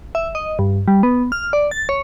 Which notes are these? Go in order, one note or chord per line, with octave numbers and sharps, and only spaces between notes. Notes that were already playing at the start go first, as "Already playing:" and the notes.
E5
D#5
G2
G3
B3
F6
D5
A6
C#5